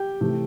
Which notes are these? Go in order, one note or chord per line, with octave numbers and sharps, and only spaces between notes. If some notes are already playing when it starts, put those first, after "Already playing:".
Already playing: G4 G5
C3 E3 A3